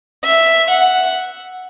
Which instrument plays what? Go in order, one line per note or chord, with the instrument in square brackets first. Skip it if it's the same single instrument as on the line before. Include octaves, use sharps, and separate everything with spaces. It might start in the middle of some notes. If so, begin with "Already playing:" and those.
[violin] E5
F#5